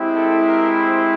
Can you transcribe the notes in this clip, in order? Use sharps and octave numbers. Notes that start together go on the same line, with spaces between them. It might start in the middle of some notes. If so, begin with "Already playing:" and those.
Already playing: G#3 C4 E4 G4
A4
A#4
C5